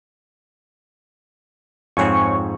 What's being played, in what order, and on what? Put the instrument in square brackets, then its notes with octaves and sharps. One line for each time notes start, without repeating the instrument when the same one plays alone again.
[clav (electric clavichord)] F2 G#2 C4 [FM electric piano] C#5 G#5 C#6